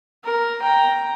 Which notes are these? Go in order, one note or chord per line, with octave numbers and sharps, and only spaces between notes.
A#4
G5 A#5